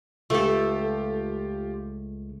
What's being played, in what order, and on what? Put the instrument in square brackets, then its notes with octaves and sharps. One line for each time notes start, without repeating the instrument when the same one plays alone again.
[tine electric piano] C#2 [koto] A3 A4 [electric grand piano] F4 G4